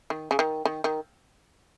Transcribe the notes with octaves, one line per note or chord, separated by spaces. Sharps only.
D#3
C#3
D#3
D#3
D#3